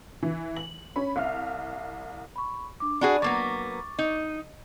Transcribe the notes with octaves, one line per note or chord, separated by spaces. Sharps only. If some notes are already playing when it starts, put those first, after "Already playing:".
E3
F#7
C#4 B5
C2 E5 F5 F6
B5 C#6
D4 D6
D4 F#4 G#4 B5
F#3 A#3 B3 C#6 D6 A6
D#4